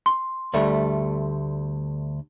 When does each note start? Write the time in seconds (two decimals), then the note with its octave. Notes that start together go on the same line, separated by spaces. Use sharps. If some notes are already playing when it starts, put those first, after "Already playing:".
0.06 C6
0.54 D2 G3 A3